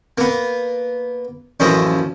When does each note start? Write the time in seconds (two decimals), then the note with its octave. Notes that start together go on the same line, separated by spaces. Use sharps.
0.18 A#3 B3
1.60 A1 F#2 F3 A#3 D#5 E5